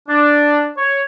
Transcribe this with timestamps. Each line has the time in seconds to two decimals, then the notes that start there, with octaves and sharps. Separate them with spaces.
0.08 D4
0.78 C#5